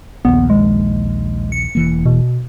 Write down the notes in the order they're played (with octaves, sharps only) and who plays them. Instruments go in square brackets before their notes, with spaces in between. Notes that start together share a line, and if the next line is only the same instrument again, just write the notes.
[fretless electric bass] A#1 D#2 [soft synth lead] B3
[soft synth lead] G#3
C#7
[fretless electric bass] E1 E3 A#3
[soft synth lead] B2